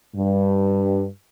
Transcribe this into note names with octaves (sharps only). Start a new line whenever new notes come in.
G2